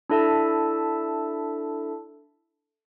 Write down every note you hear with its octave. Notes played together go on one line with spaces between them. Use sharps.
D4 E4 A4 E5 A5